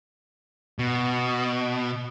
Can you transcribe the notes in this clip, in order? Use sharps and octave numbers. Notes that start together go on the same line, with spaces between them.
B2